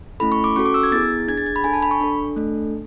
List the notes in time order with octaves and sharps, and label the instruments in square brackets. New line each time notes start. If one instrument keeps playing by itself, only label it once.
[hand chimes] A3 C#4 E4 A4 B5
C#6
D6
C#4 F#4 A4 C#6
D6
E6
G#6
B3 E4 G#4 A6
D4 G#4 G#6
A6
G#6
B5
D4 A4 G#5
A5
B5
C#6
D4 A4
A3 D4 A4